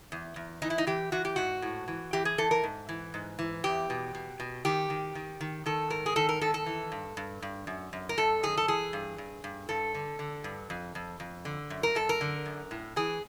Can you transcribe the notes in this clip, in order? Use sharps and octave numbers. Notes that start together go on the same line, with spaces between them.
E2
E2
E3 D#4
E4
D#4
E3 G4
E3 F#4
G4
G#2 F#4
A2
E3
E3 G4
G#4
E3 A4
A#4
G#2
E3
G#2
E3
E2 G4
B2
B2
B2
D#3 G4
D#3
D#3
D#3
D#3 A4
G#2 A#4
G#4
D#3 A4
A#4
D#3 A4
A4
E3
G2
G2
G2
F#2
F#2
A#4
F#2 A4
D#3 G#4
A4
E3 G#4
G2
G2
G2
G2 A4
D3
D3
G2
F2
F2
F2
D3
F#2
A#4
F#2 A4
A#4
D3
F#2
A2
E3 G#4